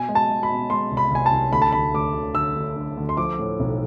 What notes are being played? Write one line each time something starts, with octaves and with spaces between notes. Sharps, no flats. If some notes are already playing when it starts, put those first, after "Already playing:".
Already playing: B2 G#5
G#3
A5
G#3
B5
B2
G#3 C6
C2
B5
C2 G#5
A5
C2
D2 B5
A5
D2 B5
D2 D6
D3
D3 E6
D2
D3
D2
C6
F3 D6
A2
B1